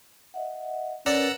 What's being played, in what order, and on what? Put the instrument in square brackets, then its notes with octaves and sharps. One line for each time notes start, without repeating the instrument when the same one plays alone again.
[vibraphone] D#5 E5 F#5
[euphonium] C#4 [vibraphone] A#4 B4 [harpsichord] D5 [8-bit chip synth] F#5 A#5 E6